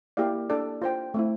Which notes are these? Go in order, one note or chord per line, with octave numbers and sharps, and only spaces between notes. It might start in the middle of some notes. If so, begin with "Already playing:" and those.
A#3 E4 G4 D5 F5
D4 A4 D5
F4 C5 G5
A3 C4 E4